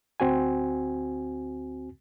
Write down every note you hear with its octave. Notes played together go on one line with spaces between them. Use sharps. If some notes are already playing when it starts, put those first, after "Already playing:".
D2 C4 F#4 G#5